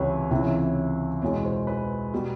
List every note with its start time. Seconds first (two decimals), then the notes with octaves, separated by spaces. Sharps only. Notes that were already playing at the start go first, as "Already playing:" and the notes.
Already playing: C#2 C3 E3 G3 B4 C#5
0.31 C#2 C3 E3
1.21 E2 B2 G#3 C#5
1.45 C5
1.67 B4
2.14 B2 G3